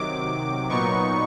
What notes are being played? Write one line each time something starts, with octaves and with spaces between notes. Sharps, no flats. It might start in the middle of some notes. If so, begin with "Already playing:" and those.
Already playing: C3 D#3 F#3 D6
A#2 F#3 B3 D#4 C#6